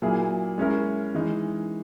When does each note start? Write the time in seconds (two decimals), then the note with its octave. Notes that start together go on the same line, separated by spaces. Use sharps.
0.02 A#2 F#3 A#3 E4 G#4
0.58 G#3 C#4 E4 A#4
1.14 E3 G#3 D#4